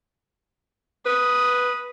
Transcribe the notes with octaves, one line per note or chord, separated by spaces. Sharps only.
B4 D#6